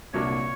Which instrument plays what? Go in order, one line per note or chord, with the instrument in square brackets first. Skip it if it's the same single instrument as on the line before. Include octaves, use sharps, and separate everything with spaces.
[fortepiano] C2 A#2 F#3 A#3 D4 [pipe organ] C#5